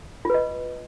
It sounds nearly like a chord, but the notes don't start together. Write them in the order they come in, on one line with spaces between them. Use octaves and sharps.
F4 B4 D#5